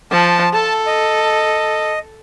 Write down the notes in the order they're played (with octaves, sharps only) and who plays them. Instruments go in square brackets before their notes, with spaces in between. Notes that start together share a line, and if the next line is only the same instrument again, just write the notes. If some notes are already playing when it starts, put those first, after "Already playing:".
[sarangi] F3 [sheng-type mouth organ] A5
[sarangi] A4 [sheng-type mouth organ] A5
[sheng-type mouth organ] D#5